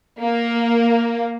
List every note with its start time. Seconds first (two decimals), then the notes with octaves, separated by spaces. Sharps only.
0.20 A#3